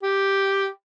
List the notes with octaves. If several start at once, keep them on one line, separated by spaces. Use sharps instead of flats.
G4